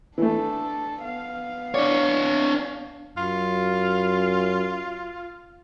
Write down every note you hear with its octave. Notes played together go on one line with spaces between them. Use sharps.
E3 A3 D4 A4
B3 F5
D4 C#5 D5
F#2 F4